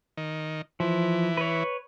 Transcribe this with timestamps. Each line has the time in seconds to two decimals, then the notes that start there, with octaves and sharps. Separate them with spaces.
0.17 D#3
0.80 E3 F3
1.37 B4 C#5